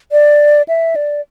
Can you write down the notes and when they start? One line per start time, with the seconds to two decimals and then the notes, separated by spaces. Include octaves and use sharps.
0.12 D5
0.68 E5
0.96 D5